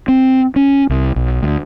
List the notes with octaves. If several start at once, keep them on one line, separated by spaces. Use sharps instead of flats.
C4
C#4
C2
B1
D2